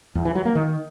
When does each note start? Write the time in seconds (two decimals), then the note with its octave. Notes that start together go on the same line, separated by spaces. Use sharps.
0.15 E2
0.25 E3
0.35 F#3
0.45 A#3
0.55 D#3